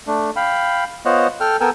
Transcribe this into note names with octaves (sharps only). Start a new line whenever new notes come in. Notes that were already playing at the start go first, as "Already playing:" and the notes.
A3 D4
F5 G5 B5
B3 F4 C5 C#5 D#5 F#5
A4 G5 F6
B3 A4 A#4 G5 G#5 E6